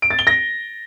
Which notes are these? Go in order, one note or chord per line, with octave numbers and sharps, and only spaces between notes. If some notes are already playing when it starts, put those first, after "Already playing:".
D7
A6
G7
A#6